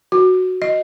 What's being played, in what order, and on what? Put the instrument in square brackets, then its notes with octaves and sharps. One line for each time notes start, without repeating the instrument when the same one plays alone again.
[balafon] F#4
D#5